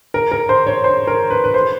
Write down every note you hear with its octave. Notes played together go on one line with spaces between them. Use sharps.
A#4
A#4
C5
C#5
C5
A#4
B4
B4
C5